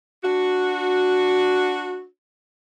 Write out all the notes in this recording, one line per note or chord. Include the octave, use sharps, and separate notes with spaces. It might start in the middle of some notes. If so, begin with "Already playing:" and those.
D4 F#4